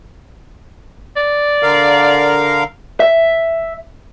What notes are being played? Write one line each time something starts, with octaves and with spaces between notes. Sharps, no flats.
D5
D3 A#4 F5
E5